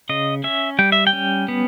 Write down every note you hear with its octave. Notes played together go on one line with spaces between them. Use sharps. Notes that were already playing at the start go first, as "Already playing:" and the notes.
C#3 D#5
C#4 E5
G3 G5
E5
G5
C#4
B3